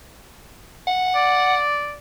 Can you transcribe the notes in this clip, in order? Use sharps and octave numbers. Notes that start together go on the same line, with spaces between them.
F#5
D5